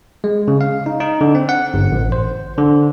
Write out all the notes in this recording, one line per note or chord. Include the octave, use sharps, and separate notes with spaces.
G#3
C#3
F5
D#4
D#4
D3
C4
F#5
G1
A1
C5
D3